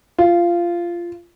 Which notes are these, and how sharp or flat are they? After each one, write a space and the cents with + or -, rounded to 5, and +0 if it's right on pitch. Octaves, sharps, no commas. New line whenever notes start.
F4 -15